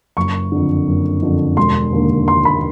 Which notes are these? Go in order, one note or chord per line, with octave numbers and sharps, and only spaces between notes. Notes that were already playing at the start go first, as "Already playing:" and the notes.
F#1 C#6
F2 D3
F#1
F2 D3
E1 C6
D#2 D3
E1 C6
B5